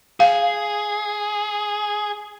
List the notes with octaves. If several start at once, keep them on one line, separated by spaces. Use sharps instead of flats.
G#4 F5